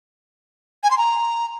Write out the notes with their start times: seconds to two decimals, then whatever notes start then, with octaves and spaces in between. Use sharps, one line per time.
0.83 G#5
0.91 C6
0.98 A#5